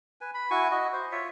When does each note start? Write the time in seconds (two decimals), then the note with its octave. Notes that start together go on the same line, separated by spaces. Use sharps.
0.21 B4 G#5
0.34 B5
0.51 E4 F#4 G#5 C#6
0.71 F#4 D#5
0.93 C5
1.12 F4 C#5 E5